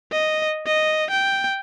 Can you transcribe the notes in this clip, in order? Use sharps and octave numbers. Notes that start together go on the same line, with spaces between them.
D#5
D#5
G5